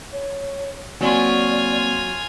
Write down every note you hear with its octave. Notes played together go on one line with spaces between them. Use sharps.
C#5
F#3 A#3 C4 C#4 F4 D5 G#5